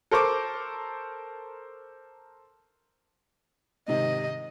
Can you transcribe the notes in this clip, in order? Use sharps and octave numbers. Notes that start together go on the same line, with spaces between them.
A4 A#4 C5 C#6 D6
G#2 C3 D#3 D#5